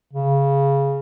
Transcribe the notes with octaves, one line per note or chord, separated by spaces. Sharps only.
C#3